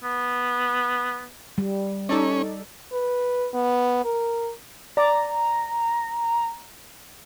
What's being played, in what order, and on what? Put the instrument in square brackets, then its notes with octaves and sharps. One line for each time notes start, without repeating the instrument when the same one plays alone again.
[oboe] B3
[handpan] G3
[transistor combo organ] C#4 [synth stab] D#4 A4 D5
[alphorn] B4
B3
A#4
[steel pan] D5 [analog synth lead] A#5